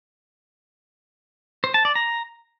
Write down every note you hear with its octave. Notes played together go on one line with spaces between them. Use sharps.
C5
A5
D5
A#5